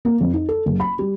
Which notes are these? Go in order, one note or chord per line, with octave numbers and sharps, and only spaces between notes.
A#3
F2
D#4
A4
F#1
B5
G3